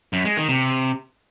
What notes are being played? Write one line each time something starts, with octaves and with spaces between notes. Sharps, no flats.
F#2
G#3
D#3
C3